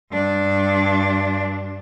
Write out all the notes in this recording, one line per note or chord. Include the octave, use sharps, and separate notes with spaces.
G2 D4